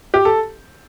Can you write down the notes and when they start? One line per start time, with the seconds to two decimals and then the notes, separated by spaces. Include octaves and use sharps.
0.14 G4
0.25 A4